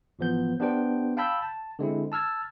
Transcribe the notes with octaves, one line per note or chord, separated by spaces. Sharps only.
G#1 E3 F3 B3 G6
B3 D4 G4 C5 G5
F5 G5 A5 B5 E6 G6
A5
D3 G#3 C4 E4
A5 E6 F6 G#6 A6